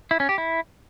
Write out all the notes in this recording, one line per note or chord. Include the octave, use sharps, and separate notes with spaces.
E4
C#4
G4
E4